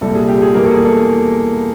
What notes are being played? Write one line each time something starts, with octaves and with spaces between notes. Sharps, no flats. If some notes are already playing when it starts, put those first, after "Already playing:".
C2 A#2 G3 A4
G#4
G4
G#4
E2 B2 G3 A#3 A#4
A4
G#4
A4